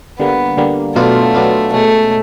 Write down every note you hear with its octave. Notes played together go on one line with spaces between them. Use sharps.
D3 G3 A#3 B3
D3 G3 A#3
B2 F#3 A3 B3 D4 F4
B2 F#3 B3 D4 F4
B2 G#3 A3 C#4